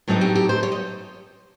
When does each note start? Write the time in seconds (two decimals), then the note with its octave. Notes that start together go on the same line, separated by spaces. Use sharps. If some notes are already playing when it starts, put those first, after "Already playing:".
0.08 A2 F#3 A3 C4 D#4 G#4
0.21 G4
0.35 G4
0.49 C5
0.63 C#5
0.72 D#5